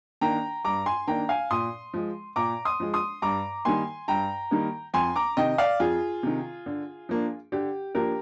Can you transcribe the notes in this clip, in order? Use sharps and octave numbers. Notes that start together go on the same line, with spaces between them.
D#3 A#3 D4 G5 A#5
G2 A#5 D6
G#5 C6
D#3 A#3 D4 G5 A#5
F5 G#5
A#2 C6 D#6
F3 G#3
A#2 A#5 D6
C6 D#6
F3 G#3
C6 D#6
G2 A#5 D6
D#3 G3 A#3 G#5 C6
G2 G5 A#5
D#3 G3 A#3
F2 G#5 C6
A#5 D6
C3 D#3 D#5 G5
D5 F5
F2 F4 G#4
C3 D#3
D3
F3 A#3 D4
D3 G4
F3 A#3 D4 G4 A#4